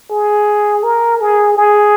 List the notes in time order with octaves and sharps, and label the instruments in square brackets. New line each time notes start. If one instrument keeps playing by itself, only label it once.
[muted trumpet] G#4
A#4
G#4
G#4